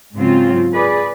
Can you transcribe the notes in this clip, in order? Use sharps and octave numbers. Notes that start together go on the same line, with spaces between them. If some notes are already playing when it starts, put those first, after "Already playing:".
G#2 C#3 F#3 C4 F4
G#4 B4 D5